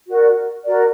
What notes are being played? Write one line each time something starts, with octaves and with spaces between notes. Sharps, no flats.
F#4 A#4 D5
F#4 A#4 D5